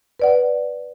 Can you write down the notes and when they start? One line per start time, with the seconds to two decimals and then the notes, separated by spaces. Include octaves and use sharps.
0.20 B4 D5 F#5